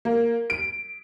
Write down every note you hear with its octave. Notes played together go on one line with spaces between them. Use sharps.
A#3
D7